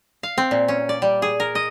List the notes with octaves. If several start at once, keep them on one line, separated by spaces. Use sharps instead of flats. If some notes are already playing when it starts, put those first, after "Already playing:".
F5
C4
A#2
C#4
D5
G3
G#4
A#4
D#5